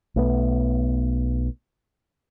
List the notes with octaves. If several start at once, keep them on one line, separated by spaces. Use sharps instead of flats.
B1 A3 B3